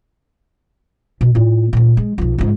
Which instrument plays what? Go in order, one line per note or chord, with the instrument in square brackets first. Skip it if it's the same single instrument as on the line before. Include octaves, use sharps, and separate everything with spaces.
[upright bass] B2
A2 F4
D2 A#2
G#3
B1 F3
C#2 G#2